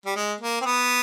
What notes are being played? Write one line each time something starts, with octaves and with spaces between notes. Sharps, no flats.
G3
G#3
A#3
C4
B3